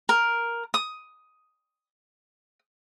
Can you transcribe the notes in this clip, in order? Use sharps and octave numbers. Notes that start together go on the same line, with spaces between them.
A#4
D#6